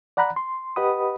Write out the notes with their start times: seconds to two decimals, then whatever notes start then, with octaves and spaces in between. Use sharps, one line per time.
0.17 D5 F#5 A#5 B5 F#6
0.36 C6
0.76 G4 B4 D#5 F#5 B5 D#6